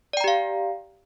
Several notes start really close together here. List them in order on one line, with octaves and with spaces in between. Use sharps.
D5 G5 A#5 G4 F5